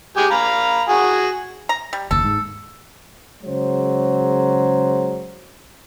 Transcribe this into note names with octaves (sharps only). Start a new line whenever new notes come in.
G#3 G4 G#5
F5 A#5 B5
F#4 G#4
A#5
G3
F#1 D#2 A4
G#2
C#3 F#3 G#3 C5